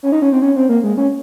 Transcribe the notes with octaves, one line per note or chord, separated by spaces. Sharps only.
C#4
D#4
C#4
C4
C#4
C4
A#3
G#3
C#4